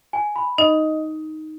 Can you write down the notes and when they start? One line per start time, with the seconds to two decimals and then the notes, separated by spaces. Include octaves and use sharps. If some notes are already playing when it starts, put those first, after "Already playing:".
0.13 G#5
0.36 B5
0.58 D#4 D#5